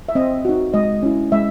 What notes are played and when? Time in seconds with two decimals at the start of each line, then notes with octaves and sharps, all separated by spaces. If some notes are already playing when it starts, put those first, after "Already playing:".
0.09 E5
0.15 C4 D#5
0.45 D#4 F#4
0.74 G#3 D#5
1.03 C#4 E4
1.32 G#3 E5